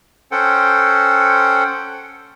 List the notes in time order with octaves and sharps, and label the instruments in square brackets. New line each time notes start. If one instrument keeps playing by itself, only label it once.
[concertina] C#4 A4 C5 F#5 G5